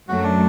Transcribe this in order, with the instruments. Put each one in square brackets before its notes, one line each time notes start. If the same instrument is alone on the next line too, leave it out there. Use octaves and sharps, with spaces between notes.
[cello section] F#2 F#3 A3 [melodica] F#4
[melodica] D4